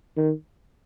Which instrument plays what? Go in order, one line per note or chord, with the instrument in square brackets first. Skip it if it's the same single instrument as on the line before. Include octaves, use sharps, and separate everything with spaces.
[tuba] D#3